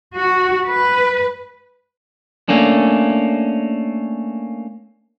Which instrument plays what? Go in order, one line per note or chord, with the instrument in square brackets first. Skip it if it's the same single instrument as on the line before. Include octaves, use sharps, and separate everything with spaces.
[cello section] F#4
B4
[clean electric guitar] A3 A#3 C#4 D4